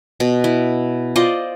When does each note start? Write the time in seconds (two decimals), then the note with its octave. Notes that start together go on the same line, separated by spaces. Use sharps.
0.20 B2
0.44 E4
1.16 F4 C5 D5 D#5